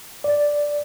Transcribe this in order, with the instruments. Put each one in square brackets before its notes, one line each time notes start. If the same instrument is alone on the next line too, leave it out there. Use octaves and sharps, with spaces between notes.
[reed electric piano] D5